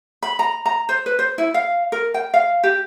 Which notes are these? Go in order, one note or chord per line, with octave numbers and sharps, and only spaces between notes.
B5
A#5
A#5
C5
B4
C5
E4
F5
A#4
G5
F5
G4